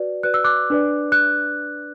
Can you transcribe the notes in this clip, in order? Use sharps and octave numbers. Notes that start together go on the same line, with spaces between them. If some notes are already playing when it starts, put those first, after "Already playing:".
Already playing: F#4 B4 D5
F#4 B4 D5 F#6
E6
D6 F#6
D4 B4 D5
F#6